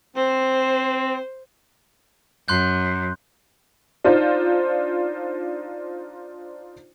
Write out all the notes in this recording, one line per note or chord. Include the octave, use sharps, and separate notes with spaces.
C4 C5
F#2 C6 F#6 G6
D4 D#4 F4 C5